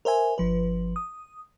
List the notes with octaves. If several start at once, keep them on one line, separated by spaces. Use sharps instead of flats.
A#4 C5 E5 G#5
G1 F3 B4
D#6